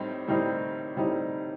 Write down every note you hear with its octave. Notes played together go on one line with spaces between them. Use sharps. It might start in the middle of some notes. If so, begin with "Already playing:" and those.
Already playing: A2 G3 C4 D#4
A2 G3 C4 D#4
A2 G3 C4 D#4